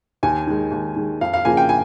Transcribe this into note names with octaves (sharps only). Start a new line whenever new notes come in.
D#2 G#5
D#3 G#3
D#2
D#3 G#3
F2 F5
F5
C#3 F3 A#3 G#5
G5
G#5